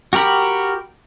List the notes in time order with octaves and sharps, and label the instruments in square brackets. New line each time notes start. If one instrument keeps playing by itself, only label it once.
[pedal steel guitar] F#4 G4 A#4 B5